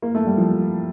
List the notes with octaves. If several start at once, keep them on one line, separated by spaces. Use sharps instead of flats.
A#3
A3
G3
F3